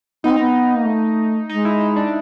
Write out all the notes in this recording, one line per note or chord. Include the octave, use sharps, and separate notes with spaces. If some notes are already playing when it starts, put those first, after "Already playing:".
B3 D#4
C4
B3
A#3
A3
G#3 D#4
E4
D#4
D4